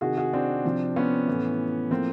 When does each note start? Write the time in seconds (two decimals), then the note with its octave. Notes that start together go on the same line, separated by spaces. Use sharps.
0.01 C3 D#3 F#4 G#4
0.17 F#4 G#4
0.33 C4 D4
0.65 C3 F3
0.96 B3 C#4
1.28 A2 E3
1.91 A2 F3 A#3 C4